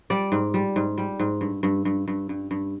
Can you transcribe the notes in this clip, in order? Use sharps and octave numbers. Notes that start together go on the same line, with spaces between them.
G3 D5
G#2
G3
G#2
G3
G#2
G2
G2
G2
G2
G2
G2